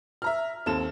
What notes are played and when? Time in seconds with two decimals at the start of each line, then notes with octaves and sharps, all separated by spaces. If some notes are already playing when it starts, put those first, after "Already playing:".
0.22 E5 A#5 F6
0.66 D#2 C4 A4 E7